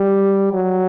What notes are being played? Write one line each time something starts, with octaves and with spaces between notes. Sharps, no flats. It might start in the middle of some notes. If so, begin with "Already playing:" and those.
Already playing: G3
F#3